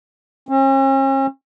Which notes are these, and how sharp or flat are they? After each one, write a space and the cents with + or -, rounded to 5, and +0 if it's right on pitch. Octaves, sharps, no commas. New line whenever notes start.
C#4 -45